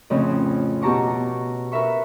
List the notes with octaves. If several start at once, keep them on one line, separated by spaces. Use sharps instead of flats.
F2 A2 C#3 F3 C4 C#4
B2 G4 A5 A#5 C#6 D6
A#4 B4 E5 B5 C#6